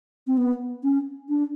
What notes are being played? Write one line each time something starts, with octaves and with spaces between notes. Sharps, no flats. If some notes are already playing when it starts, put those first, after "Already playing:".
C4
B3
C#4
D4